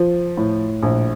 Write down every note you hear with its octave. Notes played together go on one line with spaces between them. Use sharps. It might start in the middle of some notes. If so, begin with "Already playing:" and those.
Already playing: F3
A2
A#1